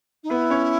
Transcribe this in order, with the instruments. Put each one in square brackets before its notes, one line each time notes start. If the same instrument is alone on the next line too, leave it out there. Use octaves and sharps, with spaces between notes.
[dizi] D#4
[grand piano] B3 B4 [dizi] E4
[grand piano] C#4 C#5